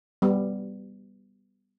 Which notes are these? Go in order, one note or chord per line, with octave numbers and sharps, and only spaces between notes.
G3 B3